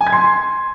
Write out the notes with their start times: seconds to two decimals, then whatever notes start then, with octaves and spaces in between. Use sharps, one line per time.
0.01 G#5
0.07 G#6
0.13 C6